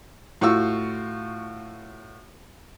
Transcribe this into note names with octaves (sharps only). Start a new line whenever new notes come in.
A2 F4 F#4 C#6 E6